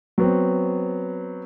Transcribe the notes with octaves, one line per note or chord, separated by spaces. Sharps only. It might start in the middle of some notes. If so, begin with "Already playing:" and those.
F#3 B3 C4